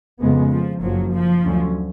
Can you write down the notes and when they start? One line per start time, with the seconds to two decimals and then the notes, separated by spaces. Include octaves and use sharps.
0.21 F2 C#3 G#3 B3
0.52 F3
0.82 F#1 F#2 F3 F#3
1.13 F3
1.44 D2 D3 F#3 C#4